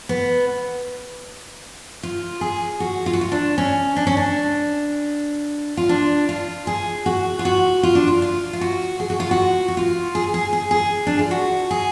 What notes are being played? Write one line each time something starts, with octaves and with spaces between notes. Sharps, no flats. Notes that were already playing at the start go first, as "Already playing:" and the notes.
B3
F4
G#4
F#4
F4
F#4
F4
D4
C#4
D4
C#4
D4
F4
D4
F4
G#4
F#4
F4
F#4
F4
D4
F4
F4
F4
F#4
G#4
F#4
F4
F#4
F#4
F4
G#4
G#4
G#4
G#4
D4
F4
F#4
G#4